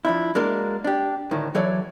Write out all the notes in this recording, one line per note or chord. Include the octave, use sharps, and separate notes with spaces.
F3 D4 E4
G#3 A#3 D4 F#4 A#4
D4 G4
D2 A2 D#3
E3 F#3 A4 C#5 D5